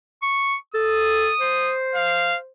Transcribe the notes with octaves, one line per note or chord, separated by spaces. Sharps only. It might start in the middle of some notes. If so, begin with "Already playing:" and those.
C#6
A4 D#6
C5
F5